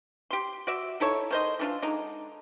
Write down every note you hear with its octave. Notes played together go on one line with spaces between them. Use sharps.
G4 C6
F#4 D5 E5
D#4 E4 A4 C#5
D#3 C5 D#5
E3 D4 F4
D3 G#3 D#4